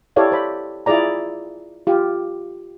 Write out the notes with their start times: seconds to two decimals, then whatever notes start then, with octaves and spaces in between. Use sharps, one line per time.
0.16 E4 G4 A4 C#5 D5 F5
0.31 E4 C5 B5
0.86 E4 F4 G#4 D5 A#5
1.87 F4 G4